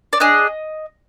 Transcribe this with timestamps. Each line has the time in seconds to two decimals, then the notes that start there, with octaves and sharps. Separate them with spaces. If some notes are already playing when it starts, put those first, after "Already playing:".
0.13 D5
0.20 D4 G#4 D#5